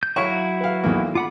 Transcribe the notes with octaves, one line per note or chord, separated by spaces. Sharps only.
G6
F#3 E4 F#4 C#5 F5 C#6
B4 F5
B1 E2 A#3
F4 F#5 B5 D6